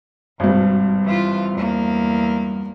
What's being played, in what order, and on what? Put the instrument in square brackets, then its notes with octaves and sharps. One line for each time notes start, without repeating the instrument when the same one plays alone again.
[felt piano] G#1 G2 [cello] B2
[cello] E3 F4
E2 A#3